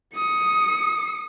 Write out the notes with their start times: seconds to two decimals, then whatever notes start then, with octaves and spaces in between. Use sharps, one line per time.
0.16 D#6 C#7